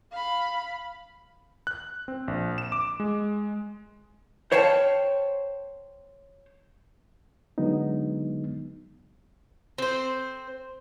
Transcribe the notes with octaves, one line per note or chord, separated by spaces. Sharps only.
F5 B5
F#6
C4
A#1
E7
D6
G#3
C5 C#5 F5 G5 A5
D3 F#3 G#3 B3 D#4
C4 C5